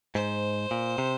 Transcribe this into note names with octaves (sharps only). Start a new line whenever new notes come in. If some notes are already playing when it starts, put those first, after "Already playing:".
G#2 C5
A#2
C3